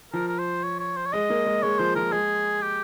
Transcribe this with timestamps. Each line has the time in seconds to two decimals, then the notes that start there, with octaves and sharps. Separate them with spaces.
0.13 F3 A#4
0.28 A#4
0.39 C5
0.63 C#5
0.80 C#5
0.97 C5
1.06 C#5
1.13 G#3 D#5
1.30 A#3
1.46 G#3
1.63 G#3 C#5
1.79 F3 C5
1.96 F3 A#4
2.12 G#3 G#4
2.62 G4